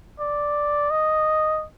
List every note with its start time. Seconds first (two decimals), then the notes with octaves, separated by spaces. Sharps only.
0.20 D5
0.91 D#5